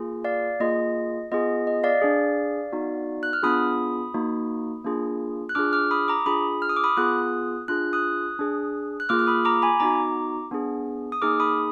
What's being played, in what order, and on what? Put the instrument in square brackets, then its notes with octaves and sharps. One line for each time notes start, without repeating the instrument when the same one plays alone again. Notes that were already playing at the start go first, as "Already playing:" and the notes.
Already playing: [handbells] A#3 F4 G#4
D5 F5
A#3 F4 G#4 D#5
B3 F4 G#4 D#5
D#5
D5 F5
D4 G#4
B3 D#4 F#4
F#6
F6
B3 D4 F4 G#4 B5 D#6
A#3 D#4 F#4
A#3 D4 F4 G#4
F#6
D4 F4 G#4 D6 F6
D6 F6
B5 D#6
A#5 D6
D4 F4 G#4 B5 D#6
F6
D#6
D6
B5 D#6
B3 F4 G#4 D#6 F#6
D4 F4 G#4 F#6
D#6 F#6
D4 G#4
F#6
A#3 F4 G#4 D6 F6
F6
B5 D#6
A#5 D6
G#5 B5
B3 D#4 F#4 A#5 D6
B3 D4 G#4
D#6
A#3 D#4 G#4 D6 F6
B5 D#6